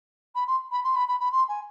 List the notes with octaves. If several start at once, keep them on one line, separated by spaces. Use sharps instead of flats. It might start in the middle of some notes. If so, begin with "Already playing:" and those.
B5
C6
B5
C6
B5
B5
B5
C6
G#5